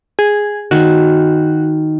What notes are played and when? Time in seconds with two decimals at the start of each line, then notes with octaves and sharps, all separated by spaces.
0.19 G#4
0.71 D#3 F#4